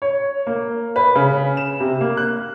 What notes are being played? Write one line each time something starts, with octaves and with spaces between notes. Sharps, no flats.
C#5
A#3
B4
C#3
E7
C3
A#3
F#6